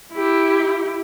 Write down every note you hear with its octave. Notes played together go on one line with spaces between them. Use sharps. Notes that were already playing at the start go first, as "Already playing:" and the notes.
E4 G4